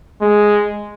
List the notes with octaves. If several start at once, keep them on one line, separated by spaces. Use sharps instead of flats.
G#3